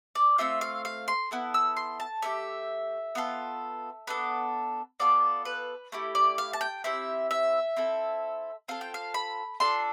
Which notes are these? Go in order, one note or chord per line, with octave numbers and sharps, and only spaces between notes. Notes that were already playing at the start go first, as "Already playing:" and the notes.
D5
A3 C4 F4 E5
F5
F5
C6
B3 E4 A4
E6
C6
A5
A3 E4 G4 E5
B3 F4 A4
B3 D4 A4
B3 F4 A4 D5
B4
A3 E4 G4
D5
F5
A5
G5
C4 E4 G4 E5
E5
C4 E4 A4
C4 F4 A4 F5
G5
F5
B5
D4 F4 A4 C6